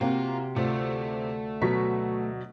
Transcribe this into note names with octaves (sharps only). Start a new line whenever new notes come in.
C3 A#3 F4 F#4
D2 C3 A3 F4
B2 F#3 C#6 B6